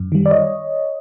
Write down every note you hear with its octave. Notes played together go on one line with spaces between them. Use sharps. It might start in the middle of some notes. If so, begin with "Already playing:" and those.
Already playing: F#2
D#3 G3
D5
C#5 D#5